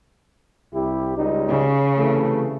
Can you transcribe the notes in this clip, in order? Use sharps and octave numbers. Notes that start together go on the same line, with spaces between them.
C2 E4 G4
C#2 G3 D#4
C#3
C3 E3 A3